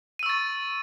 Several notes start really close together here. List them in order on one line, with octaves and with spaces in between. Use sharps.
D#7 E6 C#6 A6